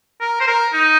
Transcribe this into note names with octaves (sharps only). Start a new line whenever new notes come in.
A#4
C5
A#4
D#4